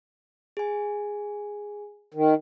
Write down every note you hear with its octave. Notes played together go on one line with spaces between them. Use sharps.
G#4 G#5
D#3